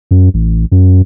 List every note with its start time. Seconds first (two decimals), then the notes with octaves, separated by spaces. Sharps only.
0.11 F#2
0.34 A1
0.72 F#2